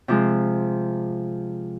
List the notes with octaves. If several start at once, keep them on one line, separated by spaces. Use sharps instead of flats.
C3 F3 G#3